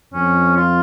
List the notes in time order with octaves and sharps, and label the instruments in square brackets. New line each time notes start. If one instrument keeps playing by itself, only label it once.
[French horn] F2 [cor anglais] C#4
[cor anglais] F4